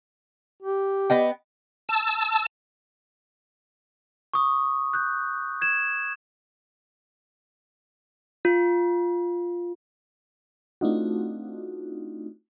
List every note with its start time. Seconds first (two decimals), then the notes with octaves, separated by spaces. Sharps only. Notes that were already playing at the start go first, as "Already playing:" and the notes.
0.62 G4
1.10 B3 D#5 G5
1.89 A5 E6
4.34 C#6 D#6
4.93 F#6 G6
5.61 G#6 E7
8.45 F4
10.81 A3 C4 D4 D#4 F4 F#4